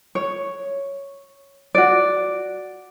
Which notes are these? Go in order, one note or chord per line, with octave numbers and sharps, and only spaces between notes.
C#5
F#4 D5